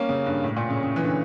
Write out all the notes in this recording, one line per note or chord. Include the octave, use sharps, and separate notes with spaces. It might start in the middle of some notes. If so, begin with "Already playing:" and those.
Already playing: G3 A#3 C#4
C#3
G2
A2
A#2
C#3
C#3
E3
D3